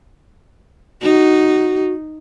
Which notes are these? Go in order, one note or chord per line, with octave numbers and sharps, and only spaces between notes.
D#4 F#4